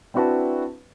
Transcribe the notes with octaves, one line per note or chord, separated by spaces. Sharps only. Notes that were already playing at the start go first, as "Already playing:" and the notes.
C4 D4 E4 F#4 B4 A5